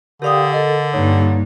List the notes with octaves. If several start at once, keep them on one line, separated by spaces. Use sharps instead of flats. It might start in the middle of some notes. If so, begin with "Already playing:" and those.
D3 G4 A#4 D5 F5 G5 D#6
A4 A#4 D#5
G2 A#3 D#4 C#5